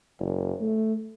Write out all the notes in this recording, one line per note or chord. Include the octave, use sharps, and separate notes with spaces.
F#1
A3